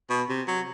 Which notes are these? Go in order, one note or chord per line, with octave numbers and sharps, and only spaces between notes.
B2
C3
F#3